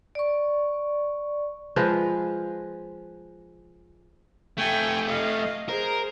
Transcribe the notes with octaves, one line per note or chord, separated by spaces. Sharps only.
D5 C#6
F3 G#3 B4
F2 A3 G5 G#5
D#5 F5
G#4 A#4 C5